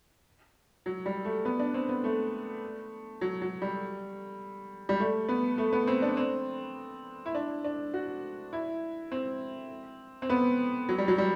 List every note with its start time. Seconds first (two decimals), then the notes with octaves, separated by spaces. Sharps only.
0.86 F#3
1.06 G3
1.25 A3
1.45 B3
1.59 D4
1.74 C4
1.89 B3
2.04 A3
3.21 F#3
3.41 F#3
3.62 G3
4.89 G3
4.99 A3
5.29 B3
5.58 A3
5.73 B3
5.87 C4
6.02 D4
6.17 C4
7.26 E4
7.35 D4
7.64 D4
7.94 F#4
8.53 E4
9.11 C4
10.22 C4
10.30 B3
10.89 F#3
10.98 G3
11.08 F#3
11.18 G3